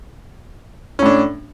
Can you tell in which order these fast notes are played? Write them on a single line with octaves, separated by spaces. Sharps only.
C#4 A2 D4